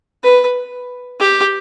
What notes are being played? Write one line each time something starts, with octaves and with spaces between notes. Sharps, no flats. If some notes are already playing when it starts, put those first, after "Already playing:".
B4
G4